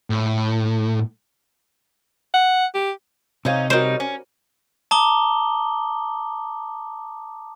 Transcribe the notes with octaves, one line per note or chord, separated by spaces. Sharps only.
A2
F#5
G4
C3 C#4 D#4 C5 C#5 F5
G3 D#4 F#4 A#4 C5 C#5
C#4
A5 A#5 D6 D#6 G7